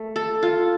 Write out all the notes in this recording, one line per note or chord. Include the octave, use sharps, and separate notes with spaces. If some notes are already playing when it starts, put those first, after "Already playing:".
Already playing: A3
A4
F4